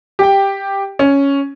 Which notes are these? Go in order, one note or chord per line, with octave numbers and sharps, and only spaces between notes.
G4 G5
C#4